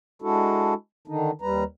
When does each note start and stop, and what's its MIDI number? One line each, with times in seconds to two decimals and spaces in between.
0.22 0.74 56
0.22 0.74 62
0.22 0.74 64
0.22 0.74 66
0.22 0.74 69
1.08 1.31 50
1.08 1.31 51
1.08 1.31 62
1.08 1.31 63
1.42 1.64 39
1.42 1.64 55
1.42 1.64 71
1.42 1.64 82